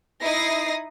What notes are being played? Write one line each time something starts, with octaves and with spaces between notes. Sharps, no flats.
D#4 E4 D#6 A#6 C7